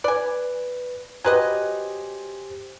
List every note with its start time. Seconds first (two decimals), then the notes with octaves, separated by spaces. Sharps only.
0.04 B4 D5 G#5
1.25 F#3 G4 B4 C5 D#5 G#5